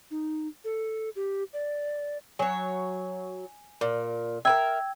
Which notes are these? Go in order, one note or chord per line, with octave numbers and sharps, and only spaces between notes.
D#4
A4
G4
D5
F#3 C#5 G#5
A#2
A#4 B4 E5 G5 E6 G#6